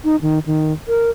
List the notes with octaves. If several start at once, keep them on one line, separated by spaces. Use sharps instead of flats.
D#4
D#3
D#3
A#4